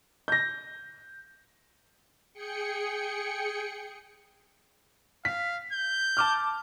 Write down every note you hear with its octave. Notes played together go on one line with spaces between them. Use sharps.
G6 A#6
G#4 G5 C#7
F5 B6
G6
A5 D6 F6